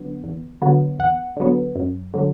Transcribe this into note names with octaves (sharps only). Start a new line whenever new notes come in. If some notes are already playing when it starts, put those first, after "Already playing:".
Already playing: D3 F#3 B3
E2
D3 F#3 B3
E2 F#5
D3 F#3 B3
F#2
D3 F#3